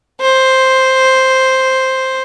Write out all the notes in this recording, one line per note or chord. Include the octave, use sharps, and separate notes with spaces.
C5